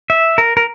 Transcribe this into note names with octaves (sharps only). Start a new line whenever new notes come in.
E5
A#4
A#4